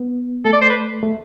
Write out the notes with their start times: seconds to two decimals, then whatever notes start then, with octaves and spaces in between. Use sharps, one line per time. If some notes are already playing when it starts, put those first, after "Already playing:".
Already playing: B3
0.45 A3 A4
0.53 D5
0.62 C5
0.70 B4
1.03 A3